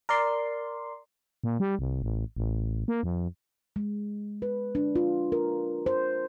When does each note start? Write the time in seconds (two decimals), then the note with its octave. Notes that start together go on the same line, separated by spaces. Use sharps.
0.09 A#4 D5 C6
1.44 A#2
1.60 G3
1.79 C2
2.03 A1
2.37 A1
2.88 A#3
3.03 F2
3.76 G#3
4.42 B4
4.75 D4
4.96 F4
5.32 A#4
5.86 C5